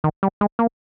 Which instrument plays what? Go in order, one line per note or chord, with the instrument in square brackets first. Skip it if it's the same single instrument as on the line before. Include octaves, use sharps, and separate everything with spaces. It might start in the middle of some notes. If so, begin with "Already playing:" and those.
[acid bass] D#3
G3
G#3
A#3